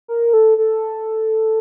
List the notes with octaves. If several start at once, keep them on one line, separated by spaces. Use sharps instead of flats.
A#4
A4
A4